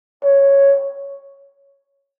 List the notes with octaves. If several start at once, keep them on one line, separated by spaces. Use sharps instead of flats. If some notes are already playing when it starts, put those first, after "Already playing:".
C#5